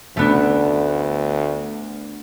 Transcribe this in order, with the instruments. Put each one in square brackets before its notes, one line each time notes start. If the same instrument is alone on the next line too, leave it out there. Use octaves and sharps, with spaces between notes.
[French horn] D2 [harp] A3 B3 D4